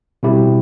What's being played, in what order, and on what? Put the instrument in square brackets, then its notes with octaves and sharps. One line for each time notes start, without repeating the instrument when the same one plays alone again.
[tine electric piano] B2 G3 C4 E4 G4